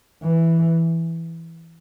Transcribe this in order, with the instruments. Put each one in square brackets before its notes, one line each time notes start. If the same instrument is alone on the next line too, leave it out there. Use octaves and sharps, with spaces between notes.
[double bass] E3